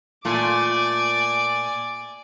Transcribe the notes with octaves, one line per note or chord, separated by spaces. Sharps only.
A#2 A3 D5 G#5 D6